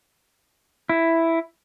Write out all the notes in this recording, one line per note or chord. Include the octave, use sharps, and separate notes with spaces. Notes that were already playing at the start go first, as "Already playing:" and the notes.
E4